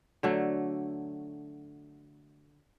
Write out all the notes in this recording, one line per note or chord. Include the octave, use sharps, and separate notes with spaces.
D3 F#3 A3